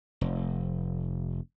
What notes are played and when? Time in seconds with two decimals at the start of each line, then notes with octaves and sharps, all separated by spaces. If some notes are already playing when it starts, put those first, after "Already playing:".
0.21 F1